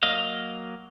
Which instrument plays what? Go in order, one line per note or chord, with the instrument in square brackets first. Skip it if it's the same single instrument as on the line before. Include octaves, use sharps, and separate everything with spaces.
[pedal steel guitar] F#3 A#3 D#5 F5